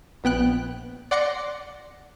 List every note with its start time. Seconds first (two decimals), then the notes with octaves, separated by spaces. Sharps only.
0.24 A#1 B3 G5 F#6
1.11 D5 F#5 C6 D6 A#6 C#7